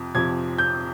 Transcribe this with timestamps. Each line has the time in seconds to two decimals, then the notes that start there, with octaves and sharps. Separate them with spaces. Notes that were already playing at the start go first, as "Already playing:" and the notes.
Already playing: F2 C3 F3
0.15 F2 C3 F3 G#6
0.58 G6